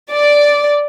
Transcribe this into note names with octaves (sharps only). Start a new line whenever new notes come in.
D5